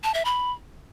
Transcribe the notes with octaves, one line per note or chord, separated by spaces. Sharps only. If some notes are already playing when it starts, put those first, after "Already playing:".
A5
E5
B5